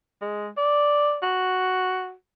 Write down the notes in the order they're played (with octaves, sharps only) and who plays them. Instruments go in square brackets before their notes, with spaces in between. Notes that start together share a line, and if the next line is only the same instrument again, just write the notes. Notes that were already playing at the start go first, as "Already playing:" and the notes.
[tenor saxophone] G#3
D5
F#4